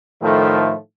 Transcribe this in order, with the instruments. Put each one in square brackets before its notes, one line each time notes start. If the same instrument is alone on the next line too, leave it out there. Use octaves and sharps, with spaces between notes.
[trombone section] A2 D#3 F3 A3